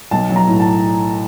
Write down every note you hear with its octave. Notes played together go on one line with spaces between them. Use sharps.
B1 A5
F#3
A#5
A2
A5